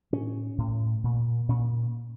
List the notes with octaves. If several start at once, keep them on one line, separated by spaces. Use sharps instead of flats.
A2 C#4
A2
A#2
A#2 C#4